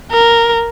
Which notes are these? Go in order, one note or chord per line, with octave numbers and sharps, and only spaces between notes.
A#4